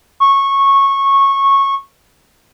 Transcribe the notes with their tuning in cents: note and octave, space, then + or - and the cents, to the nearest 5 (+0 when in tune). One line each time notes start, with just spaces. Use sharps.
C#6 -15